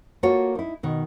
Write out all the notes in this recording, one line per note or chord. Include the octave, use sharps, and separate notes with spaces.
A#3 F4 F#4 A4 C#5
D#4 E4
B2 D#3